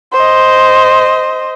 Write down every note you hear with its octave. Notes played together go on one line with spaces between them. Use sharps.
C5 D#5